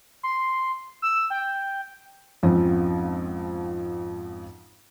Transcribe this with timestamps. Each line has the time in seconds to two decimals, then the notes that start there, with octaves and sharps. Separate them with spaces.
0.23 C6
1.02 E6
1.30 G5
2.43 G#1 F2 F3 C4 C#4